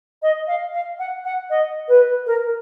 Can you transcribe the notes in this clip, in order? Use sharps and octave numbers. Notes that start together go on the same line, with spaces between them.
D#5
F5
F5
F#5
F#5
D#5
B4
A#4